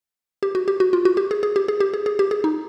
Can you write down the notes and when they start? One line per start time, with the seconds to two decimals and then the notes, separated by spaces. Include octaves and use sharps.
0.43 G4
0.55 F#4
0.68 G4
0.80 F#4
0.93 F4
1.05 F#4
1.17 G4
1.31 G#4
1.43 G#4
1.56 G4
1.68 G#4
1.80 G4
1.94 G#4
2.06 G#4
2.19 G4
2.31 G#4
2.44 D#4